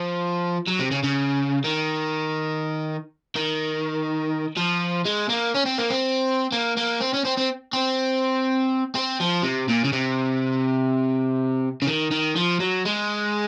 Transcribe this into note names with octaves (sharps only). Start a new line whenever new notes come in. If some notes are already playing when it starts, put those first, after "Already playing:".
Already playing: F3
F#3
C3
C#3
C#3
D#3
D#3
F3
G#3
A#3
C#4
C4
A#3
C4
A#3
A#3
C4
C#4
C4
C4
C4
C4
F3
C3
A#2
C#3
C3
C#3
D#3
D#3
F3
F#3
G#3